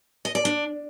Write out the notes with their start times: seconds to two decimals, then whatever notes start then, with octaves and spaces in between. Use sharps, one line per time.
0.25 D#5
0.35 D5
0.45 D4